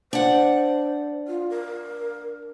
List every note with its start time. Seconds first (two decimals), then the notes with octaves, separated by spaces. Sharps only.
0.13 D4 C5 F#5
1.28 F4
1.50 A#4